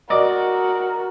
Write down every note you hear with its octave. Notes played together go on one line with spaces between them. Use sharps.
F#4 A#4 D5 D#5